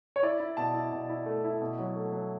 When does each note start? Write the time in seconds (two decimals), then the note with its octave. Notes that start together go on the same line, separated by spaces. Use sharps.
0.16 C#5
0.23 E4 D5
0.40 E4
0.57 B2 A5
0.74 E4
0.92 B2
1.10 E4
1.26 A3
1.44 E4
1.61 B2
1.78 F#3
1.96 A3
2.12 F#3